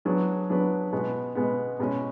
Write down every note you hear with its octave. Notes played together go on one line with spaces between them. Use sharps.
F#3 B3 D4 G#4 B4
F#3 B3 D4 G#4 B4
B2 G#3 B3
B2 G#3 B3
B2 G#3 C#4